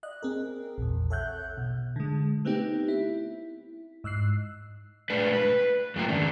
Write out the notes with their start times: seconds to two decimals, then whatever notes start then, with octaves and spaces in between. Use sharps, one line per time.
0.03 D5 D#5 F#6
0.23 C4 G#4 A#4
0.78 A#1 E2
1.10 A4 C#5 E5 F#5 F#6 G6
1.57 B2
1.96 D3 G#3
2.45 A3 B3 C4 D#4 G4
2.88 E4
4.04 G#2 E6 F#6 C7
5.10 A2 G#3 D4 B4
5.33 B4
5.96 F#2 A3 A#3 F4 G5 A#5
6.08 D#3 C#4 D4